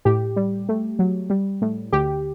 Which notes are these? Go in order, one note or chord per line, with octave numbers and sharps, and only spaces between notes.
A2 G4
G3
A3
F#3
G3
A2
D2 G4